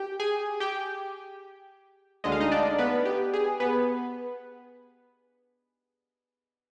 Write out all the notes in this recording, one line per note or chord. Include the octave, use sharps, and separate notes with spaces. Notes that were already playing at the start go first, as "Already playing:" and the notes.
Already playing: G4 G5
G#4 G#5
G4 G5
D2 D3 G#3 D#5
F5
D#4 D#5
D4 D5
B3 B4
G4
G#4
B3 B4